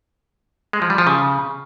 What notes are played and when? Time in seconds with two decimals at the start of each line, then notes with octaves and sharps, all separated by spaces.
0.73 G#3
0.82 F3
0.90 G3
0.98 F3
1.07 C#3